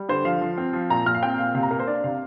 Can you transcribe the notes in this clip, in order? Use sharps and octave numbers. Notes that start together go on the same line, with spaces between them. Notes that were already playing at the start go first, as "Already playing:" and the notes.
Already playing: G3
D3 C5
F3 F5
F3
C4
F3
A#2 A#5
A#2 F6
F5
C4 G5
A#2 F5
C3 F5
A#5
A#3 A#4
C5
D4 D5
C3 F5